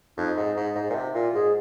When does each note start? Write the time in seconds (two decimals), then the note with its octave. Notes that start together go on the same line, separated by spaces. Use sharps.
0.17 F2 D#4
0.37 G#2
0.57 G#2
0.76 G#2
0.90 A#2
0.95 C3
1.14 A#2 F4
1.34 G#2 G#4